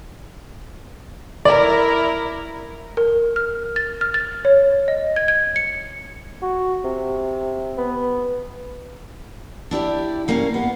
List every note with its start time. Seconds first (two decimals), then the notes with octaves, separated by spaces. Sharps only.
1.45 E4 A#4 D5
2.97 A#4
3.36 F6
3.76 A6
4.01 F6
4.14 A6
4.45 C#5
4.88 D#5
5.16 G#6
5.28 G#6
5.56 C#7
6.42 F#4
6.84 C3
7.77 B3
9.71 D4 E4 G4 D5
10.28 G3 A#3 C#4 A#4 F5
10.54 B3